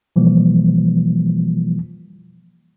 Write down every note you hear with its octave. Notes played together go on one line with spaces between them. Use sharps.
B2 E3 F3 G3 A#3